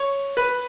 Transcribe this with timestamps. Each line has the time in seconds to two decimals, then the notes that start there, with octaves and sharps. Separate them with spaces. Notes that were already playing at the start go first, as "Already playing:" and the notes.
Already playing: C#5
0.37 B4